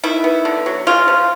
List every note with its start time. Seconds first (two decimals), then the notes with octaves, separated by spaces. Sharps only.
0.03 D#3 E4
0.24 B3
0.45 D3
0.66 F#3
0.87 C#3 F4
1.08 F3